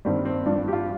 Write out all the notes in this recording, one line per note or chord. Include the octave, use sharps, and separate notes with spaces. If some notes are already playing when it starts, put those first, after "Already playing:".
G2 D#3 G3 C4
C4
G2 F3 D4
G4
F4